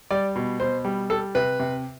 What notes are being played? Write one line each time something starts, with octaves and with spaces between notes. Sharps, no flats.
G3 D5
B2
B2 C5
G3
G3 A4
C3 B4
C3